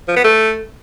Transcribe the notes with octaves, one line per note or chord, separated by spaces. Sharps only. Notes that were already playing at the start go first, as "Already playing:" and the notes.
F3
B3
A3